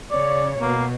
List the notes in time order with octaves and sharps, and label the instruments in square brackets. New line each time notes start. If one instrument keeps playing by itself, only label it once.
[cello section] C#3 C#5 [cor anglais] D5
[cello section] B2 [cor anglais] A#3